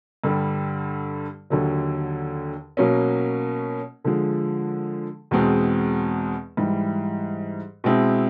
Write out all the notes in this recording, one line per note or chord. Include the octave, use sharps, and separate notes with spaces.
G2 D3 G3
D#2 D3 F#3
B2 F#3 A#3 C#4
D3 F3 G#3
E2 B2 G#3 C4
G#2 E3 G3
B2 G#3 C4 E4